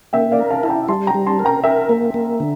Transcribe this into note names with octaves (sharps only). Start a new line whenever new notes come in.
A#3 E5 G5
D5 F5
A#4
F5 A5
E4 A5
G5 A#5
G3 A5 C6
G5 A#5
G3
A5 C6
A#4
G5 A#5
A#4 E5 G5
A#3
A#3
D3